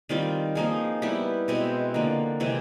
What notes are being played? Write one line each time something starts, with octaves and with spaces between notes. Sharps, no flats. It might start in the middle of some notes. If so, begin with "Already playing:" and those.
D#3 G3 C4 F4
F3 A#3 D#4 G#4
G3 B3 E4 G4
B2 G#3 C4 E4
D3 F3 A#3
C3 E3 G#3 C4